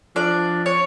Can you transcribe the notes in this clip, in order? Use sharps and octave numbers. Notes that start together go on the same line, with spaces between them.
F3 D4 D5
C#5